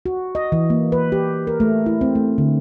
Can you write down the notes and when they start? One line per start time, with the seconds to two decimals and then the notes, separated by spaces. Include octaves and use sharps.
0.06 F#4
0.35 D#5
0.52 E3
0.70 A#3
0.92 B4
1.12 G4
1.47 A#4
1.60 A3
1.86 E4
2.01 C4
2.15 A3
2.38 D3